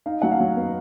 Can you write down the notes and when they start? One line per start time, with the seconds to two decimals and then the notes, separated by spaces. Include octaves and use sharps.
0.06 D#4 F5
0.22 F#3 F#5
0.31 F5
0.40 F#3
0.57 B3